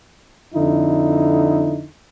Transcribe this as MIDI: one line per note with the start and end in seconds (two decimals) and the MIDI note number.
0.54 1.85 41
0.54 1.85 50
0.54 1.85 63
0.54 1.85 64